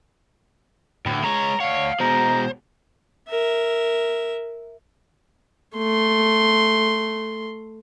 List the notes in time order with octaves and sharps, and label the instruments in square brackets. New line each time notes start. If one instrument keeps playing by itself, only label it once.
[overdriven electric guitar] D2 [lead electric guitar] A2
[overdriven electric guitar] G#3 C#5 [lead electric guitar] B4 A#5
[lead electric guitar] A3 F#5 [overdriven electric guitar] C#5 [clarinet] F5
[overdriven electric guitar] B2 G#3 [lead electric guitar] C5 [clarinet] A#5
[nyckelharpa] A#4 E5
A3 C6